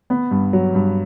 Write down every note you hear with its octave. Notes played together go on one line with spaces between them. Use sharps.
B3
G2
F#3
G2